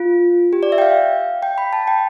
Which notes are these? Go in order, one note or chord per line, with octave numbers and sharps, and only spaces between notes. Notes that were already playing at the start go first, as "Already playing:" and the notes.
Already playing: F4
G4
D5
E5
G5
F5
G5
B5
A5
G5